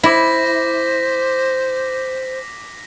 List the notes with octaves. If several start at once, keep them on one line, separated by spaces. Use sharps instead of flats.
E4 C5 D6 A#6 B6